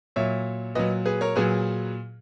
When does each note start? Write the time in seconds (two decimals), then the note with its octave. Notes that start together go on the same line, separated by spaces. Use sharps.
0.16 A#2 F#3 C#5 E5
0.75 A#2 F#3 B4 D#5
1.05 G#4 B4
1.21 A#4 C#5
1.36 A#2 F#3 G#4 B4